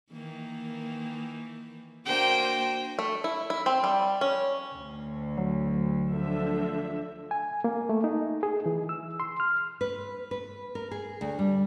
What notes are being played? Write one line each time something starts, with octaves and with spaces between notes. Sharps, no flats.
D#3 E3 A#3
A#3 D4 F#4 C5 G5
A3
E4
E4
C4
G3
C#4
D2
F#3
D3 F3 E5
G#5
A#3
A3
D#4
G#4
E3
E6
C6
F6
B4
B4
A#4
G#4
D2
G3